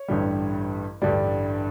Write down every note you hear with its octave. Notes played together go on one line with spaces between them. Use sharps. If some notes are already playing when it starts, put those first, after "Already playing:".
Already playing: C#5
A1 G2 D3 G3
A1 G2 D3 G3 D5